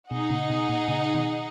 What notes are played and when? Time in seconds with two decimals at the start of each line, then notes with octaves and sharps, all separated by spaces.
0.10 B2 D#4 G#4 D#5 F#5
0.30 A#2 C#3
0.50 B2
0.69 A#2
0.88 A#2 C#3
1.14 B2 D#3